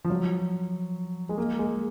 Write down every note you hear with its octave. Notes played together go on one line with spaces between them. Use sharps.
F3
F#3
G#3
A#3
G#3